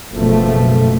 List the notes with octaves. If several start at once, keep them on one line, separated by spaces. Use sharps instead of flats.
F#1 B2 F3 A3